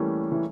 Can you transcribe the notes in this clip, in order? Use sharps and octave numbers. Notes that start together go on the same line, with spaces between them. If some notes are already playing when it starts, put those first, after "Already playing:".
Already playing: E3 G3 A3 A#3 C#4
E3